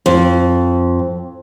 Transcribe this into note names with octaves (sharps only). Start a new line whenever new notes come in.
F2